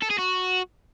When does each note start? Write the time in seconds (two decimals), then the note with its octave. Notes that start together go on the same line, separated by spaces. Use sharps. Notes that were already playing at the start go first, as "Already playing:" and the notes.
0.02 A4
0.10 G#4
0.18 F#4